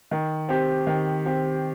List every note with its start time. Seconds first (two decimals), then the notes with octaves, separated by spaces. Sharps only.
0.11 D#3
0.49 C4 G4
0.87 D#3
1.25 C4 G4